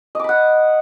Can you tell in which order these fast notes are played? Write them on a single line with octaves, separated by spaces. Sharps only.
D#5 D6 B5 F#5